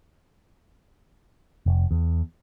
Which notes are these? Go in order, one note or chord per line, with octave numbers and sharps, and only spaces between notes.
F1
E2